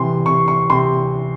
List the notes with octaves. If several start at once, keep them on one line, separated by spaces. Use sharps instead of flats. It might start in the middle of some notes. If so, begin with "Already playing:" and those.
Already playing: C3 E3 C6
C3 C#6
C#6
C3 C6